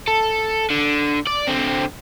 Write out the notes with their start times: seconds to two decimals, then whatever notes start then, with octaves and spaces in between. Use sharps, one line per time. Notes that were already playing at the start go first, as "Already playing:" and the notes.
0.08 A4
0.70 D3
1.27 D5
1.47 D3 C4